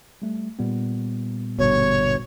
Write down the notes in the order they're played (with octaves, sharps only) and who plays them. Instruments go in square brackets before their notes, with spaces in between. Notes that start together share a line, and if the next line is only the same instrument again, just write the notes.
[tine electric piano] G3 A3
A#2 G3 B3
[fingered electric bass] G1 G2 B2 [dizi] C#5